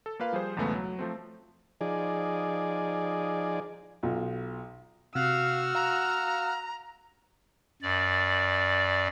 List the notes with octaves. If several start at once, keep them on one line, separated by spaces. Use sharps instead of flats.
A4
A#3 F4 B4 F5
F3 G3 G#4 C5
B1 E2 C#3 G#3 A3 B3
F#3
F3 A3 C4
F3 D#4 G#4 D5
B1 F4
C3 F#4 F5 F#5 E6 F6
F5 A#5
F#2 D5